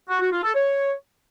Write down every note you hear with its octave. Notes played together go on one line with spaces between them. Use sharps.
F#4
F#4
F4
A4
C#5